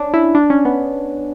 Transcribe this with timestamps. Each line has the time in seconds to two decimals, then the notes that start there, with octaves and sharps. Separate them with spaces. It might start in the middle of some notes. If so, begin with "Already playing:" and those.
Already playing: C#4 D4
0.14 E4
0.35 D4
0.50 C#4
0.65 B3